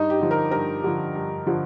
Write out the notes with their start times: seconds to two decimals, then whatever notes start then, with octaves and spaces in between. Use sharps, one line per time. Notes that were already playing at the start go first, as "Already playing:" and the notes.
Already playing: G2 D#4
0.10 G4
0.20 D3 F3
0.31 A#4
0.51 G2 A#4
0.84 D3 F3
1.15 G2
1.47 D3 F3